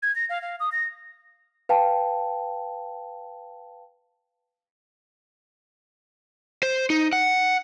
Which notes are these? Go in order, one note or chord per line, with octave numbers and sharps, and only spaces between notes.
G#6
A#6
F5
F5
D#6
A#6
B4 F5 G5 A5
C5
D#4
F#5